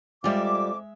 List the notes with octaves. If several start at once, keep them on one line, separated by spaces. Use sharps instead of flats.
F2 G3 G#3 F4 E5 D6